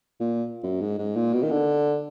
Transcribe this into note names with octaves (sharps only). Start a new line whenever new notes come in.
A#2
F#2
G#2
G#2
A#2
B2
D#3
D3